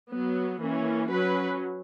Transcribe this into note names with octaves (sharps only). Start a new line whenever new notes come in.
F#3 B3
E3 A#3 C#4
F#3 C#4 B4